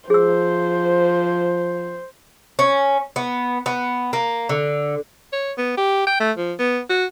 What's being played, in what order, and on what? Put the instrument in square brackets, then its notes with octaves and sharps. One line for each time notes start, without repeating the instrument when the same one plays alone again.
[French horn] F3 [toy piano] G#4 E6 [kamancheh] C5
[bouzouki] C#4
B3
B3
A#3
D3
[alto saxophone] C#5
B3
G4
G5
A3
F3
B3
F#4